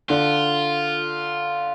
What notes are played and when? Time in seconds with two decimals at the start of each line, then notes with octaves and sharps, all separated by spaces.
0.09 D3 F4